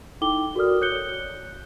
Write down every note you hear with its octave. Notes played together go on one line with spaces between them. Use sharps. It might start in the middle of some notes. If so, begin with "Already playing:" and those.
D#4 E4 A4 G5 D6 G7
F#4 A4 A#4 D5 D#6 F6
C#5 F#6 G6 C#7 G7